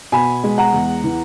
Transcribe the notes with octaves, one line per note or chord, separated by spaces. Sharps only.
B2 G#5 B5
G#3
F#5 A#5
E2
E3